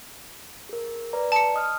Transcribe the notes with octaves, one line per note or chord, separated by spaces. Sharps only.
G#4 A#4
B4 D5 A#5
A5 C#7
D#5 D#6 F6